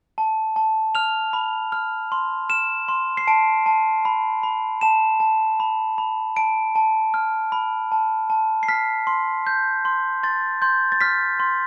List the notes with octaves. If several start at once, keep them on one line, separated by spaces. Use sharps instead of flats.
A5
A5
F6 F7
B5
F6
C6
F6 E7
C6
C7
A5 D7
A5
B5
B5
A5 E7
A5
B5
B5
A5 D7
A5
F6
B5
A5
A5
C7
F6 B6
C6
G6
C6
C6 A6
C6 G6
A6
F6 B6
C6